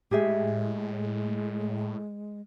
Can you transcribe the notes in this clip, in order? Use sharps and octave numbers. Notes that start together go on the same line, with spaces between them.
A2 G#3 G4 G#4 E5